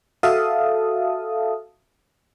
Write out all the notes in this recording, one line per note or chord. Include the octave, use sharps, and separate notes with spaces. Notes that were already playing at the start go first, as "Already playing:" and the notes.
F#4 A4 E5 F5 A5 D#6